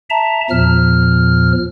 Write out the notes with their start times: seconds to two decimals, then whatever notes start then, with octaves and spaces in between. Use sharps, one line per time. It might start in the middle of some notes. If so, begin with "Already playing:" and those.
0.10 E5 A5 A#5
0.50 E2 A#2 F3 F6